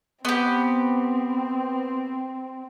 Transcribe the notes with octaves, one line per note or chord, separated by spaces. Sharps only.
B3 C4 G4